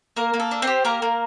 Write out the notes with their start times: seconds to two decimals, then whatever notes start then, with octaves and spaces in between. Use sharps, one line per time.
0.16 A#3 A#4
0.34 A#3
0.40 A4
0.51 D4
0.62 C4 G4 C5
0.85 A#3 A#4
1.02 A#3